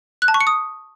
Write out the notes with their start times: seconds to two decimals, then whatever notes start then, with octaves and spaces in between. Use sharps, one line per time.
0.22 F#6
0.28 A5
0.34 C#6
0.41 C#7
0.47 D#6